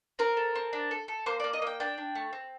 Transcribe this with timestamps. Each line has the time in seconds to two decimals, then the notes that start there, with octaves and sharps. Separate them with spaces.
0.19 C4 A#4
0.37 A4
0.55 C4
0.73 D4
0.91 A4
1.08 A4
1.26 A#3 C5
1.40 A#3 D5
1.53 D#5
1.62 A#3 G5
1.80 D4 G5
1.98 D4
2.15 A3
2.33 C4